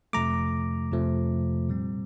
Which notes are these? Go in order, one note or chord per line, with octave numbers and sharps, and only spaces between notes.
F2 C3 F3 A3 A#5 D6
F2 C3 F3 A3
A#2 G3 C4